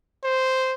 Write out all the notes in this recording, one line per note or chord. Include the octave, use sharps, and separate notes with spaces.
C5